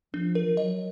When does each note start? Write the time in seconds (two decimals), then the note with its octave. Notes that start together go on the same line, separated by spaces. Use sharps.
0.14 F3 D4
0.35 A#4
0.46 F3
0.57 F#3 D#5